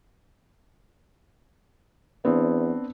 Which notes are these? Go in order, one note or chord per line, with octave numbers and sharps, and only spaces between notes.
E2 B3 C4 D4